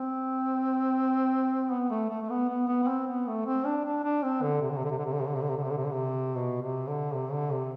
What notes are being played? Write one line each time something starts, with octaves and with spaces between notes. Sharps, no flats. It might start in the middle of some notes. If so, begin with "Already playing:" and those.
Already playing: C4
B3
A3
A3
A3
B3
B3
B3
B3
C4
B3
A3
C4
D4
D4
D4
C4
D3
C3
D3
C3
D3
C3
D3
C3
D3
C3
D3
C3
D3
C3
D3
C3
D3
C3
D3
C3
B2
C3
D3
C3
D3
C3